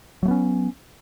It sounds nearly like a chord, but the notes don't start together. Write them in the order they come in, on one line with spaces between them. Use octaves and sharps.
F#3 A3 B3 C#4